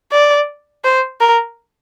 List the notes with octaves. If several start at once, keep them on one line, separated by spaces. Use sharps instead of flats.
D5
C5
A#4